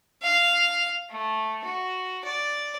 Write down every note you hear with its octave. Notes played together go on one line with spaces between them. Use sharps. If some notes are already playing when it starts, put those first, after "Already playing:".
F5
A3
F#4
D5